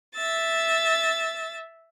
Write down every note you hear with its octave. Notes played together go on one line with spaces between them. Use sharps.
E5 E6 A6